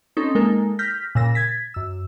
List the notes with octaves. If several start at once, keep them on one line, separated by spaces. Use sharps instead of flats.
C4 C#4 D#4 A4
G#3 A#3 D#4 A4 A#4
F6 G6 A#6 B6
A#2 C#3 E6 A#6
G#6 A6 B6
F#2 E6